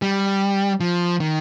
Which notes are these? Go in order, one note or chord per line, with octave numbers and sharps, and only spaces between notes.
G3
F3
D#3